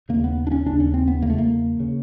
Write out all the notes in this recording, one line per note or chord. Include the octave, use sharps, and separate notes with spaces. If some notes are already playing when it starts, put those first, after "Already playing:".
D#2 C#3 A#3
B3
D4
C#4
D#2 C#3 D4
C#4
C4
B3
E2 C#3 A3 A#3
A#3
C#3